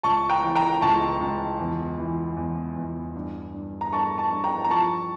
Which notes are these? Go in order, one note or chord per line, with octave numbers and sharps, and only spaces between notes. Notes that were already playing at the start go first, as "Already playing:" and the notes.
C#2 A5 C#6
G5 A#5
E3
G5 A#5
C#2 A5 C#6
C#2
E2
E3
E2
E2
G2
G2
A#5
G2 A5 C#6
A5 C#6
G2
G5 A#5
A#5
F3 A5 C#6